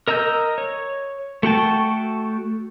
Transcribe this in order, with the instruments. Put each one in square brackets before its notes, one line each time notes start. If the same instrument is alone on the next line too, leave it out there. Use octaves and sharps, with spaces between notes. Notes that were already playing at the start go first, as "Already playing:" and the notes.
[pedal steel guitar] A#4 D#5 A#5 E6 G6
C#5
A3 F#4 G5 A5